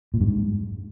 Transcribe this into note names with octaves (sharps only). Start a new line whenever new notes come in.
A#2
G2
G#2